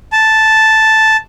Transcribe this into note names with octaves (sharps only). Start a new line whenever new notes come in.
A5